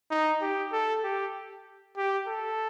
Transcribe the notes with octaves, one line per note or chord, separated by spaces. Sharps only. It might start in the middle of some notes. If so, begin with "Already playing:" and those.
D#4
G4
A4
G4
G4
A4